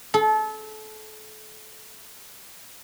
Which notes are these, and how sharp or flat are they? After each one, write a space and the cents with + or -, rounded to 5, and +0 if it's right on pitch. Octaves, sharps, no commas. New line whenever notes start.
A4 -30